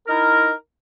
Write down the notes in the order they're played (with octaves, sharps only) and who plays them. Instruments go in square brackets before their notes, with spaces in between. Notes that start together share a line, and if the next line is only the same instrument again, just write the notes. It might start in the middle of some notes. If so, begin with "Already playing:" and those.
[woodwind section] D#4 E4 A#4